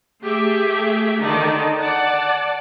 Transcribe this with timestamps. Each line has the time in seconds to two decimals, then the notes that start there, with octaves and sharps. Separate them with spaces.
0.24 A3 G4 G#4 E5
1.22 D3 D#3 D#4 D5 A5
1.80 D5 F#5 A5